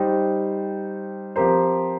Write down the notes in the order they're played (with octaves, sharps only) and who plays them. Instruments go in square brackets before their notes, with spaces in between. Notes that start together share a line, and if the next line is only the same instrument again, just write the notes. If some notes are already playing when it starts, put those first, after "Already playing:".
Already playing: [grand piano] G3 D#4 C5 [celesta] G4 G5
[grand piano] F3 C4 G4 C5 [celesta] A#4 A#5